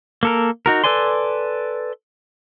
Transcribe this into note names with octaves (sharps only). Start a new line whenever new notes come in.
A#3 A4 A#4
D#4 F#4 A#4
A4 B4 D5 G#5 C6